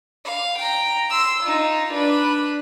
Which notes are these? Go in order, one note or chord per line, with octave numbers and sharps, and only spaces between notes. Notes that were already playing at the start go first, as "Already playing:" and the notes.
F5
G5 A#5
C6 E6
D#4 F4
D4 B4